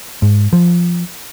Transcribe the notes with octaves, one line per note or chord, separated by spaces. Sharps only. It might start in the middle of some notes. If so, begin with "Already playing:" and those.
G#2
F3